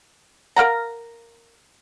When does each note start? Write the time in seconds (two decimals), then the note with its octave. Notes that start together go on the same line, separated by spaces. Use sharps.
0.56 A#4 F5 F#5 A#5